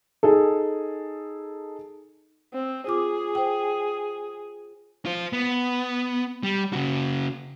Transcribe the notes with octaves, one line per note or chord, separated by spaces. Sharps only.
D#4 G#4 A4
C4
F4 G#4 D6
C5 G5
F4 C5
B3
G3
C#3 F#4